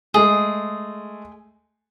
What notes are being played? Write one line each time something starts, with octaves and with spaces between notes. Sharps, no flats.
G#3 A3 G#4